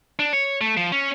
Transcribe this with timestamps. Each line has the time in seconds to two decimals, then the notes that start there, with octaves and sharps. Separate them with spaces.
0.19 D4
0.33 C#5
0.61 A3
0.77 F3
0.92 C#4